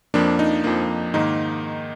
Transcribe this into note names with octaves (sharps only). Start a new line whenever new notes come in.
F2 F3 A#3 D4
D#4
F2 F3 A#3
G#2 D#3 A#3 D#4